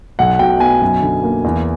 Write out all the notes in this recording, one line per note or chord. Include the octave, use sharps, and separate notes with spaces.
B1 F#5
B2 G5
B3 G#5
F#2
D3
A#3
E2